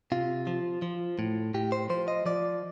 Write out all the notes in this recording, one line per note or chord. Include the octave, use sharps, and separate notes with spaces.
C3 F4
F3
F3
A2
A2 G4
C5
F3 C5
D#5
F3 D5